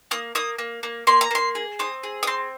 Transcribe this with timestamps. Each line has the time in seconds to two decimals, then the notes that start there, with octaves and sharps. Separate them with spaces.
0.11 A#3 D#6
0.35 A#3 D#6
0.58 A#3
0.83 A#3
1.07 A#3 C6
1.21 A#5
1.31 A#3 C6
1.55 G#4
1.79 C4 D#6
2.03 G#4
2.23 D#6
2.27 C4 C6